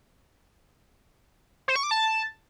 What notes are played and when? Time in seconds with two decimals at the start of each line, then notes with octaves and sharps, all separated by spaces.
1.68 C5
1.76 C#6
1.83 D6
1.91 A5